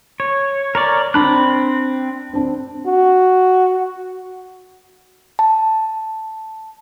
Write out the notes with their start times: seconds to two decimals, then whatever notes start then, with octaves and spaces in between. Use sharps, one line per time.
0.20 C#5
0.75 A#4 C#5 D5
1.14 C4 D4 B5 F#6
2.33 C4 D4
2.86 F#4
5.39 A5